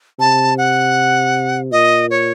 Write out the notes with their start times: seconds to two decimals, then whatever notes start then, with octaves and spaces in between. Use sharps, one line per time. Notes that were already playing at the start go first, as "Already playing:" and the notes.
0.19 C3 A5
0.58 F#5
1.71 A#2 D#5
2.11 C#5